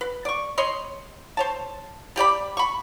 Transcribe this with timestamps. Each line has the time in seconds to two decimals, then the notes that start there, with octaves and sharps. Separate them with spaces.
0.01 B4
0.25 D5 C#6
0.58 C#5 D#5 B5 C6
1.37 C5 C#5 A5
2.16 G3 G4 D5 B5
2.57 B5 C#6